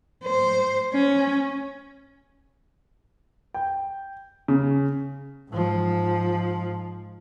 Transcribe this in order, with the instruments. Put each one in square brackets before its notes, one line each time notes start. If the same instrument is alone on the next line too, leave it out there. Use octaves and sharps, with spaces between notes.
[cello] C5
C#4
[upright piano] G5
C#3
[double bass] G#2 F3